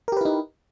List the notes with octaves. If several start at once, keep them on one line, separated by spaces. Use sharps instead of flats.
D#4 E4 G4 A#4 B4